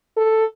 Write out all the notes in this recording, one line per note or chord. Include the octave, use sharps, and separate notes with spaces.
A4